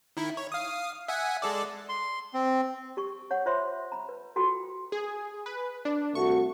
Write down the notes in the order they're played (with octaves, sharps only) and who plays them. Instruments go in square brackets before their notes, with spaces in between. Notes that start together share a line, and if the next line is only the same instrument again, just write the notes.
[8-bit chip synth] D#3 E4
C#5
F5 D#6
E5 F#5 G#5
G#3 A4 D5
[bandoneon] C6
C4
[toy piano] G4 C#6
C#5 F#5
F4 C5 C#5 E5 B5 C6
A#5 B5
B4
F4 F#4 A4 G5 B5 C6
[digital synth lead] G#4
B4
D4
[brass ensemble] C2 A3 F#4 [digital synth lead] C#6